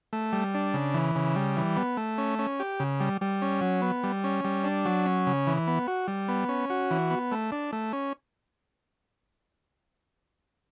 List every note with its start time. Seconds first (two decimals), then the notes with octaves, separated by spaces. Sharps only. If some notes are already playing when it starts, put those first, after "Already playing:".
0.13 A3
0.33 G3
0.54 D4
0.74 C#3
0.94 E3
1.15 C#3
1.36 G3
1.57 E3
1.76 B3
1.97 A3
2.18 C#4
2.39 C#4
2.60 G4
2.80 C#3
3.00 G3
3.21 G3
3.42 C#4
3.61 F#3
3.82 B3
4.03 G3
4.24 C#4
4.45 G3
4.64 D4
4.85 F#3
5.06 C#4
5.27 C#3
5.47 E3
5.67 B3
5.87 F#4
6.08 G3
6.28 B3
6.49 C#4
6.70 F#4
6.91 E3
7.11 B3
7.32 A3
7.52 D4
7.73 A3
7.93 C#4